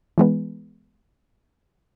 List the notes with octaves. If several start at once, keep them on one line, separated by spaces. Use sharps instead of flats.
E3 G#3 B3